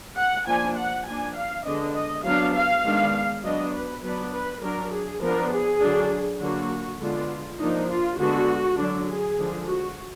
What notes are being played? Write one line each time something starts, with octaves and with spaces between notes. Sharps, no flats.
F#5
F3 A#3 D4 G#5
F#5
F3 A#3 D4 G#5
F5
D3 G#3 B3 D4 D#5
D#5
F#3 B3 D4 F5
F5
D#3 G#3 B3 D4
F#3 B3 D4 D#5
B4
F#3 B3 D4 B4
B4
F#3 D4 A#4
G#4
F3 B3 D4 A#4
G#4
D3 F#3 D4
D3 F#3 A#3 D4 F#4
D3 G#3 B3 D4 F4
F3 A#3 D4 D#4
F4
D3 G#3 B3 F#4
D3 F#3 D4
G#4
D3 F3 G#3
F#4